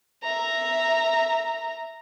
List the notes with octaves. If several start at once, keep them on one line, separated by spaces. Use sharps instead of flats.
E5 A#5